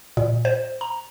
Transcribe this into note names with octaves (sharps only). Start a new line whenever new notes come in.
A#2
C5
A#5